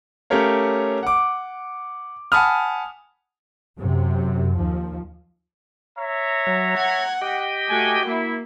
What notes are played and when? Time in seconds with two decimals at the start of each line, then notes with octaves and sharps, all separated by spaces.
0.30 A3 C#4 G4 A#4 C#5 F5
1.03 F#5 D6
2.32 F#5 G#5 A5 B5 D#6 F6
3.79 F#2 C3
4.56 D#2 F3
5.98 C#5 E5 A#5
6.47 F#3
6.77 F#5 G#6
7.21 G4 D#5 G5
7.69 A3 F#4 F#5 G#5
8.07 A#3 E4